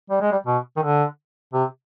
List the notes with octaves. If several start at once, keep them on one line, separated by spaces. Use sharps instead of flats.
G3
G#3
G3
B2
D#3
D3
C3